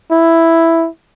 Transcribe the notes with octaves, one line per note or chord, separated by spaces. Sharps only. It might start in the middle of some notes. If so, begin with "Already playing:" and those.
E4